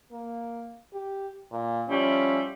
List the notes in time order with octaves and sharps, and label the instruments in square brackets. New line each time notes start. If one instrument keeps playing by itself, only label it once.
[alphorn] A#3
G4
A#2
[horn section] F3 G3 E4 [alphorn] C#4